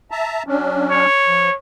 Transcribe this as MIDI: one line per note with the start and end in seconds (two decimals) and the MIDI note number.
0.11 0.43 76
0.11 0.43 81
0.11 0.43 82
0.47 1.06 54
0.47 1.06 61
0.47 1.06 62
0.90 1.55 73
1.27 1.49 53